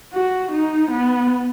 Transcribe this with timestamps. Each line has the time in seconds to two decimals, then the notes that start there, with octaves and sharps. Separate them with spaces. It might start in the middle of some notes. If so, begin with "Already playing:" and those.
0.14 F#4
0.52 D#4
0.91 B3